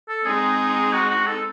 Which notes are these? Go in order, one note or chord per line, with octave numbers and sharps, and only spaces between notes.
A4
G#3 C4 D#4 G#4
F#4
F#4
A4